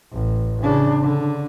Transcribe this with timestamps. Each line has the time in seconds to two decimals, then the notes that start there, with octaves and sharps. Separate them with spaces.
0.12 A1
0.62 C#3 D4
1.02 D3